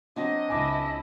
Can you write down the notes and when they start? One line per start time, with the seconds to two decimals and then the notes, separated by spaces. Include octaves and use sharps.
0.16 F#3 C4 D4 D#5
0.49 C#2 E4 E5 G#5 A5 D6